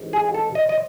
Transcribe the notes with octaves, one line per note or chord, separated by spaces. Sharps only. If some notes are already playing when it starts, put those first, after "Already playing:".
Already playing: A1 G#2 D#3
G#4
A4
D#5
D#5